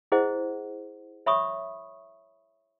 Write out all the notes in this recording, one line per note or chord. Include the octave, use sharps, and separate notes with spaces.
E4 G#4 C5 D#5 F#5
C#5 E5 B5 C#6 D#6